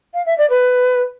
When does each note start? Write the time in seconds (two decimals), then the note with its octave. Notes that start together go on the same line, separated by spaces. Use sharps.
0.14 F5
0.26 E5
0.38 D5
0.50 B4